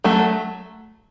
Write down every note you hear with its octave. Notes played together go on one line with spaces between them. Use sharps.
F#3 A3